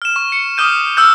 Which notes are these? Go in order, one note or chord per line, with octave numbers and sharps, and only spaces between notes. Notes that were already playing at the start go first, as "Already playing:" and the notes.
F6 E7
C#6
C#7
D6 D#6 F6 G6 D#7
E6 F6 G6